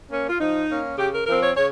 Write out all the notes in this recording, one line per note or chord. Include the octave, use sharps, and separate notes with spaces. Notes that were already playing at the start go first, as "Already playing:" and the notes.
A#3 C#4
F4
F3 D#4
A#3 C#4
C#3 G4
A#4
F3 C4 A#4
C#5
C#3 C#5